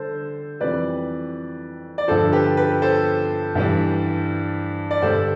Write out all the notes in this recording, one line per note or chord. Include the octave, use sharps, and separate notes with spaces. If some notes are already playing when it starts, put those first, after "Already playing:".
Already playing: D3 G3 A4 C5
F2 E3 G3 B4 D5
D5
G2 D3 F3 A4 C5
G4 B4
G4 B4
A4 C5
G2 E3 G3
D5
G2 D3 G3 A4 C5